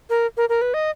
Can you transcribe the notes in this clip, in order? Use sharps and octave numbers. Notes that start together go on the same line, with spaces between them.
A#4
A#4
A#4
B4
D#5